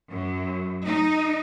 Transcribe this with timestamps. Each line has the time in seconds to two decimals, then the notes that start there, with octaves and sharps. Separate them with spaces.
0.10 F#2
0.85 D#4